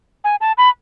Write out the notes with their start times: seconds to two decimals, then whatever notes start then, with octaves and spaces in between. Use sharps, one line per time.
0.24 G#5
0.41 A5
0.57 B5